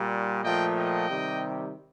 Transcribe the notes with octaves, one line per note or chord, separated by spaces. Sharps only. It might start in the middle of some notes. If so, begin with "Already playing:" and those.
Already playing: A#2 G3
A#2 F3 A3 D#5 G5
D#5 G5
C3 D#3 G3